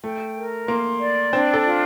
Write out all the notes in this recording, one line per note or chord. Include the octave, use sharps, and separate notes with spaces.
A3 G5
A#4
A#3 C6
D5
C4 D4
A4
F4